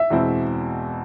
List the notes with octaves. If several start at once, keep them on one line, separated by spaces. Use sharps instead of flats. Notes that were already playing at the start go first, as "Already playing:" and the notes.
Already playing: E5
E2 B2 G#3 C4 E4